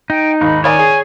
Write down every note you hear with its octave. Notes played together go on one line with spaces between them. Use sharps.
D#4 G5
D#2 G#2 B5
D#3 C#5 D5 G#5
G#4